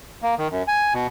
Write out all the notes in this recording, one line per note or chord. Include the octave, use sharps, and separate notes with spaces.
A#3
D#3
F#2
G#5
B2